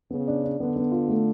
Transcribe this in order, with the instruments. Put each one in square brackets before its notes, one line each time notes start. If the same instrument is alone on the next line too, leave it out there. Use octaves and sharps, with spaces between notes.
[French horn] C#3 [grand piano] B3
[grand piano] D4
D4
[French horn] D3 [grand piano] B3
[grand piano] B3
F4
A3